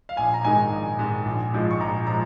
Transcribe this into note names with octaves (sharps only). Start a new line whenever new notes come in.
F5
A#1 G#5
A#5
G#2 D#3 G#3 G#5
A#1
G#2 D#3 G#3
A#1
G#2 F3 G#3
C#6
A#1 A#5
F3 G#3 A#5